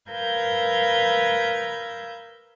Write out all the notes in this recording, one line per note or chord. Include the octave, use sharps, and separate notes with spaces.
A#4 B4 F5 E6 G6 G#6